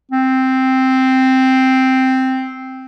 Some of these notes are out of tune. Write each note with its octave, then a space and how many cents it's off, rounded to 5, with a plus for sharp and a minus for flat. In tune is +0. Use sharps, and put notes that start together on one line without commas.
C4 +0